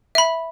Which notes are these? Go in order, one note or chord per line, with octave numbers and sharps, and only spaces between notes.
E5 B5